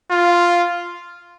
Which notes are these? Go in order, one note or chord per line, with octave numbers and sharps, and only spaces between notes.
F4